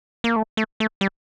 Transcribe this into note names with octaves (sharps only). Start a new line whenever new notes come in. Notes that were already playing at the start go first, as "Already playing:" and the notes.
A#3
A3
A3
A3
G3